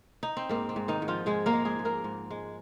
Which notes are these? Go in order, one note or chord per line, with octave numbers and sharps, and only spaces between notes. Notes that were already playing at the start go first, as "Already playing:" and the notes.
D#4
C4
G#2 A#3
C4
G#2
D#3 D#4
G#2
F3 F4
G#2 G#3 G#4
A#3 A#4
G#3
G#3 G#4
G#2
A#3 A#4
G#2
G#3